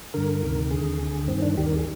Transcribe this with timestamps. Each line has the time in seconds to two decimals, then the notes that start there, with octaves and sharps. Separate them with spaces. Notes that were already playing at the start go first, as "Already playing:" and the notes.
0.14 G2 D3 A#4
0.43 D2 C3 D#3
0.71 D#2 D3 G#4
1.00 D2 D3
1.28 G2 D#3 C4
1.42 D4
1.57 D#2 D#3 G4
1.66 A#4
1.76 G#4